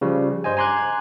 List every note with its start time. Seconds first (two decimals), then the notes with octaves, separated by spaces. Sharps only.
0.01 C#3 F3 G3
0.44 G2 C5 D#5 G#5
0.57 G#5 A#5 C6 D6 F#6 G#6